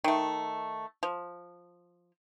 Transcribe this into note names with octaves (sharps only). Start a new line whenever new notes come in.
D#3 A3
F3